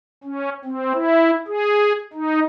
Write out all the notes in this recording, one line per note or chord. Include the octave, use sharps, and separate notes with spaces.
C#4
C4
E4
G#4
D#4